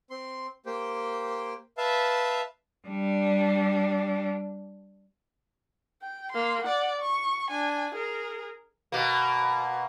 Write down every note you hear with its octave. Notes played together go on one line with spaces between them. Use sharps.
C4 C6
A#3 G4 C5 G5
B4 E5 F5 A5
G3 D4
G5
A#3 C6
D5 F#5
C#6
D4 G#5
G#4 A#4
B2 A#3